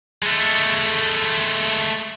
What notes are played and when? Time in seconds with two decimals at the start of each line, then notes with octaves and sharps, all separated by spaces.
0.23 G#3 A3